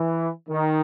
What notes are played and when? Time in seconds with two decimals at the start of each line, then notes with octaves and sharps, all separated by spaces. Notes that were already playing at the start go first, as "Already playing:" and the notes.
Already playing: E3
0.48 D#3